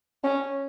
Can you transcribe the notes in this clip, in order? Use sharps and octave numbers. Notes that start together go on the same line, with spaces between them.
C#4